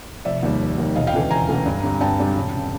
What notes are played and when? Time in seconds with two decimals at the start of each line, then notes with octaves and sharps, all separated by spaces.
0.25 F1 D5 E5
0.43 D#2 D#3 G3
0.60 F1
0.78 D#2 D#3 G3
0.95 E1 D#5 F5
1.07 F5 G5
1.13 D2 C#3 E3 A3
1.31 E1 G#5 A#5
1.48 D2 C#3 E3 A3
1.66 G2
1.83 D3 G3 C4
2.01 G2 G5 A5
2.19 D3 G3 C4
2.36 E1
2.53 C#3